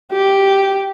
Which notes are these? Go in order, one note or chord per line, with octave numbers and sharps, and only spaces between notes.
G4